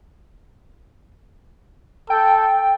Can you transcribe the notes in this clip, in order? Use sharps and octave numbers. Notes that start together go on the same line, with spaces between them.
A4 G5